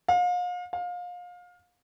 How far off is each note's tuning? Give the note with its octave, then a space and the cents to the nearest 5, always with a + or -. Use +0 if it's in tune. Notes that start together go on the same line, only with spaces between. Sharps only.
F5 +40
F5 +30